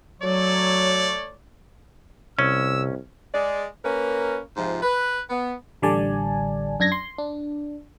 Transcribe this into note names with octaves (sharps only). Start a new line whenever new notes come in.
F#3 A3 C#5 D5
C2 C3 C#4 E6
G#3 D5
A#3 C#4 A#4 B4
G#2 C3 F3
B4
B3
A1 D3 G3 D5 G#5 A5
F#2 D4 G#6 A#6
C6
D4